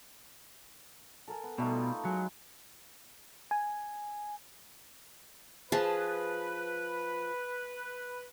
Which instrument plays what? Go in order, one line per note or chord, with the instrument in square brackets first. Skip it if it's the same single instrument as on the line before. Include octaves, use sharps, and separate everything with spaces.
[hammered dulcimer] A4 A#4 G#5
B3
[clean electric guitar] B2 [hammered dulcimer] G3 A3 D#4
[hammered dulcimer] F4
[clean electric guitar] F#3 [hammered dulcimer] G#3
[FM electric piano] G#5
[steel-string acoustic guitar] F3 [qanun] G#4 A5 [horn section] B4